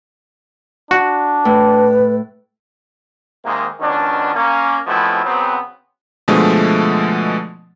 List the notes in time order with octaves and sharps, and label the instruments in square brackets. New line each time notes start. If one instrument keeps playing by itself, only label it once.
[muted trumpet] D4 [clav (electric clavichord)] F#4
[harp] A2 [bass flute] B4
[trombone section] G#2 C3 D#3 G#3 A#3
C#2 B2 D#3 C#4 D4
A#3 C#4
F#2 B2 F3 A3 C4 E4
C#3 F#3 B3 C4
[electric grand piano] B2 D3 F3 G#3 A3